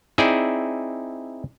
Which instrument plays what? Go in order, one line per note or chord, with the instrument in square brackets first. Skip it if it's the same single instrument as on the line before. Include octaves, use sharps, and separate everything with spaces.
[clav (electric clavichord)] C4 D#4 E4 G#4 D5